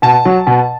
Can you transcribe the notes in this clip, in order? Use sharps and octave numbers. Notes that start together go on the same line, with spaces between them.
B2 A5
F#3
B2